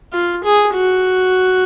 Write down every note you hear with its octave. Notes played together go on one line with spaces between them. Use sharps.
F4
G#4
F#4